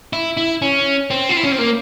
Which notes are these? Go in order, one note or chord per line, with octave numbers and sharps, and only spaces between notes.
E4
E4
C#4
C4
F4
E4
C#4
C4
A#3